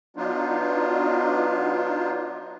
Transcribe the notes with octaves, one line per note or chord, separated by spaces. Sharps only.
F#3 B3 D4 D#4 F4